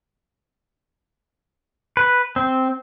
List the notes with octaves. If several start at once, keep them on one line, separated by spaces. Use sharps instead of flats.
B4
C4